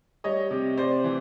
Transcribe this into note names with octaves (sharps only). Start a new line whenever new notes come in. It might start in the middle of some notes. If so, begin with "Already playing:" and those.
G3 C#5 D#5
C3
C3 C5 D5
E3